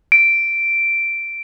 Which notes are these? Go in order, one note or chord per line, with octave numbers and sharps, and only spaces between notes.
D7